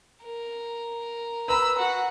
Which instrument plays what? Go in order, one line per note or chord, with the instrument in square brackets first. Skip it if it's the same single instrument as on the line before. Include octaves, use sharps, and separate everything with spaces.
[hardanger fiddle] A#4
[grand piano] B4 A#5 B5 [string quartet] E6
[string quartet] F#4 [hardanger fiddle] F#5